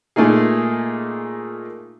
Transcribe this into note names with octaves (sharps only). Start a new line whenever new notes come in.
A#2 A3 A#3 D#4 G#4